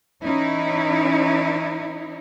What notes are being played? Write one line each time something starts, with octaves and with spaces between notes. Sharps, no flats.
E3 C#4 D#4 E4